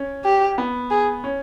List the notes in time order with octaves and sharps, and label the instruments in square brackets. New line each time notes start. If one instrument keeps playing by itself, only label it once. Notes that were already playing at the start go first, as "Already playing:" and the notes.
Already playing: [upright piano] C#4
[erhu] G4
[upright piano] B3
[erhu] G#4
[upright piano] C#4